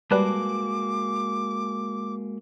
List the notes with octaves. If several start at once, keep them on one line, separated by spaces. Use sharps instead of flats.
G3 G#3 A#3 F#4 B4 A5 D6